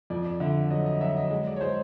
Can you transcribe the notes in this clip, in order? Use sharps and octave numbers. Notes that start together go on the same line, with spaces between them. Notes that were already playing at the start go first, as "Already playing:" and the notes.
F2 D5
D5
D3 E5
F#3 D#5
D#5
F#3 E5
D#5
G#3
D5
C#5
G#3 C5